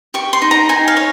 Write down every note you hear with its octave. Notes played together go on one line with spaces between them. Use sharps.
G4 C#6
C6
D#4
A#5
D#4 G#5
F5
C#5